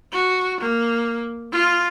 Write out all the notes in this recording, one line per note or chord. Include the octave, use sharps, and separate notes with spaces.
F#4
A#3
F4